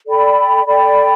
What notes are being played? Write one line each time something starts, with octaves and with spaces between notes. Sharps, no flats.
A4 D5 G5 B5
A4 D5 G5 B5